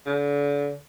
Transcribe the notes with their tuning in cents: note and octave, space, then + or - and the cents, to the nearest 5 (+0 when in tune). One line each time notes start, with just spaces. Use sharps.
D3 -35